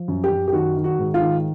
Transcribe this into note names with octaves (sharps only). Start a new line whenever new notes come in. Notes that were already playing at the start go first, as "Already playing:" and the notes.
Already playing: F3
F#2
G4
F#2
G4
D#3 F#4
D#3
F#4
G#2
F4
D#3